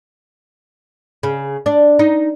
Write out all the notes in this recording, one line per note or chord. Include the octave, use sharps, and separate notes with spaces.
C#3
D4
D#4